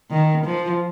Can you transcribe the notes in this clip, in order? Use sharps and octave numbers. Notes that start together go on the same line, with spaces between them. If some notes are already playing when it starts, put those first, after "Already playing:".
D#3
F3